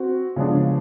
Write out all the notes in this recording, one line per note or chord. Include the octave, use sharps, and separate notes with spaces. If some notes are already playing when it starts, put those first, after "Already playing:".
Already playing: C4 F#4
C#3 F3 G#3 B3 D4